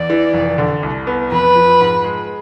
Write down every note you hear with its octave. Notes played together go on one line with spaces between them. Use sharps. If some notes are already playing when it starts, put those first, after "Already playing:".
Already playing: E2 D5
E3
F1
D3
C2
B3
F2 B4
F3
G#2
G#3